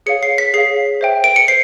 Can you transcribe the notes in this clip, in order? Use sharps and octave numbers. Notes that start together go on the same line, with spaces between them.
G#4 C#5 F5 C#7
C7
B6
G#4 C#5 F5 C7
C5 E5 G5
D7
C#7
C5 C7